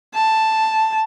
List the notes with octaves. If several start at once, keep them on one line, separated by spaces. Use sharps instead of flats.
A5